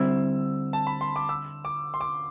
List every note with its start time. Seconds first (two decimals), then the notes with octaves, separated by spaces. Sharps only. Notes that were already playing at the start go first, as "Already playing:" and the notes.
Already playing: D3 G3 C4 E4 E6
0.73 A5
0.87 B5
1.01 C6
1.16 D6
1.29 E6
1.65 D6
1.94 C6
2.01 D6